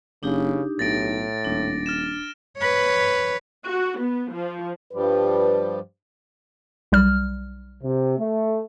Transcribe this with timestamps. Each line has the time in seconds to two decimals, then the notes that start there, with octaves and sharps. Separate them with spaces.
0.23 F#1 C#3 D4 D#4 G4
0.79 B1 A2 A6 A#6 D7
1.45 D#1 D4
1.86 F6 A6 E7
2.58 B4 C#5
3.66 F#4
4.00 B3
4.32 F3
4.93 G2 F3 G3 B4
6.92 B1 G3 F6
7.83 C3
8.18 A3